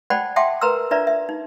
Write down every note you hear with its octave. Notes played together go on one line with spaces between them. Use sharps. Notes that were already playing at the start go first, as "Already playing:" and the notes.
C5 D5 F#5 G5 A5 B5
E5 F#5 G5 A5 C6 D6
A#4 B4 A#5 C6 E6
D4 F4 B4 D5 E5 A#5
E5
D#4